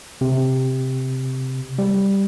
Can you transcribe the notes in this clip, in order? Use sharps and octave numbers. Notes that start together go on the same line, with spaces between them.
C3
G3